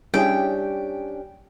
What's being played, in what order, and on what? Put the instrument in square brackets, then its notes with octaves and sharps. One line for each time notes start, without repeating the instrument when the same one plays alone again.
[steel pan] G3 E4 G#4 [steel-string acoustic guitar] C#4 D4 G4 [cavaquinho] G5